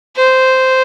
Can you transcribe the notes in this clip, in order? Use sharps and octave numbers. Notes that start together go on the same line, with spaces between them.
C5